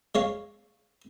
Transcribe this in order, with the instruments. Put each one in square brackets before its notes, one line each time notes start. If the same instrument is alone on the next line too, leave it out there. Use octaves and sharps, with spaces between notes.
[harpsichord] G#3 C#5 F5